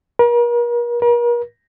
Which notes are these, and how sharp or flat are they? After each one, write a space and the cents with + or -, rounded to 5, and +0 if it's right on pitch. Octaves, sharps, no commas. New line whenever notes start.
A#4 +40
A#4 +40